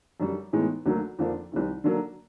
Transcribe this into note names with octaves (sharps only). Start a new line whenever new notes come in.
F#2 D3 G3
A2 E3 G#3 B3 D#4
D2 D3 F#3 A#3
F2 D3 F3 A#3 D4
C2 C3 D#3
D3 F#3 A#3 D4